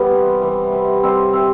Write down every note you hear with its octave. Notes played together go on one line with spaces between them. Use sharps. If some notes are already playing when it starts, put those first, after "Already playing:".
Already playing: E3 G3 B3
C3
E3
C3
G3 C4
C3 C4